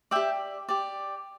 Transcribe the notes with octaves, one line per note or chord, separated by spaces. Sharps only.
G4 D5 E5 G5
G4 D5